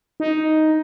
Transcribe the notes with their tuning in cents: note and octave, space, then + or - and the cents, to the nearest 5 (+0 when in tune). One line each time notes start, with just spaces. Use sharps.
D#4 +5